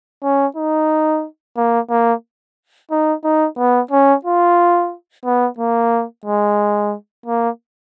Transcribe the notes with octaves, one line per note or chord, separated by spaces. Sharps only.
C#4
D#4
A#3
A#3
D#4
D#4
B3
C#4
F4
B3
A#3
G#3
A#3